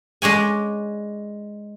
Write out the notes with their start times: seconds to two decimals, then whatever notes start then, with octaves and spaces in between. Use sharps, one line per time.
0.22 G#3 D4 C#5 G#5